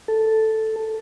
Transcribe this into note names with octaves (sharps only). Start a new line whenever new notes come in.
A4